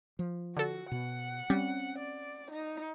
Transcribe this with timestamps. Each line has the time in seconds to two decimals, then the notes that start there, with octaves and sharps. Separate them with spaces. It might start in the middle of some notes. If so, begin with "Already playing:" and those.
0.19 F3
0.57 D3 F#4 A4
0.92 B2 F#5
1.50 G3 C4 C#4
1.98 D5
2.51 D#4